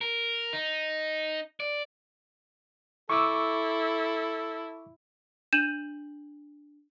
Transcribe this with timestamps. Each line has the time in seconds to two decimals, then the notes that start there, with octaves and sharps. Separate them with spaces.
0.01 A#4
0.53 D#4
1.60 D5
3.10 E4 A4 C#6 D6 E6
5.53 D4 G6 D#7 E7 F#7